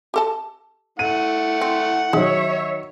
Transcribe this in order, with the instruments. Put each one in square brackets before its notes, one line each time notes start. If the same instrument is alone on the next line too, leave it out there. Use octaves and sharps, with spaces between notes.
[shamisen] G4 A4 A5
[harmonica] A3 F#5 [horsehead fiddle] E4 [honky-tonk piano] D#7
[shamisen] C4
[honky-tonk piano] D#3 F#3 [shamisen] G#4 [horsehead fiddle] C#5 E5